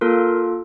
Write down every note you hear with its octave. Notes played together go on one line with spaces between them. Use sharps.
A#3 F4 A4 A#4